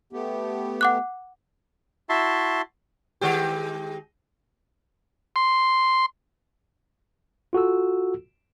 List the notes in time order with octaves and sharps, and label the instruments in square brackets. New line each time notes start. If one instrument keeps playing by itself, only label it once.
[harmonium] A3 B3 G4
[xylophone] F#5 D6 F#6
[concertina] E4 F#4 E5 A5 C6
[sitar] D#3 G#3 G4
[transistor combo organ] C6
[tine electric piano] F4 F#4 A4 E6